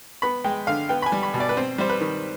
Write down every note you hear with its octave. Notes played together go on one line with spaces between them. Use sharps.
B3 B5
G#3 G5
D3 F5
B3 G5
B5
G#5
G3
B5
B2
D5
B4
C4 C5
G3 C5
B4
D#3